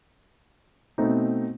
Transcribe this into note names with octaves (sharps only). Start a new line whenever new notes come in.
B2 A3 C4 D#4